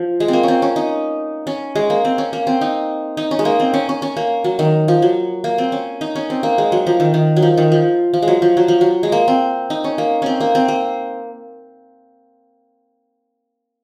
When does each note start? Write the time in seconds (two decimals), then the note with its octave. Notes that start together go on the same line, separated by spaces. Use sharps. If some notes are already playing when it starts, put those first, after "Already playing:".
Already playing: F3
0.20 G#3
0.28 A#3 C4
0.43 C4 C#4
0.62 C#4
0.76 D#4
1.47 C#4
1.75 G#3
1.90 A#3
2.05 C4
2.18 C#4
2.33 A#3
2.47 C4
2.61 D#4
3.17 D#4
3.31 C#4
3.39 G#3
3.45 A#3
3.60 C4
3.74 C#4
3.89 C#4
4.02 C#4
4.17 A#3
4.44 F#3
4.59 D#3
4.88 F3
5.02 F#3
5.44 A#3
5.58 C4
5.72 C#4
6.01 D#4
6.15 C#4
6.30 C4
6.43 A#3
6.58 G#3
6.72 F#3
6.87 F3
7.00 D#3
7.14 D#3
7.36 F#3
7.42 F3
7.57 D#3
7.72 F3
8.13 F3
8.22 G#3
8.28 F#3
8.42 F3
8.57 F#3
8.68 F3
8.81 F#3
9.03 G#3
9.12 A#3
9.28 C4
9.70 D#4
9.84 C#4
9.98 A#3
10.22 C4 C#4
10.40 A#3
10.55 C4
10.68 A#3